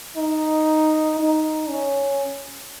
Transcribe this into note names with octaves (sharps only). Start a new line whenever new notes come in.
D#4
D#4
C#4